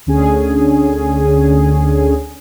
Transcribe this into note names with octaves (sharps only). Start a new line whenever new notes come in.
D2 D3 C#4 G#4 G#5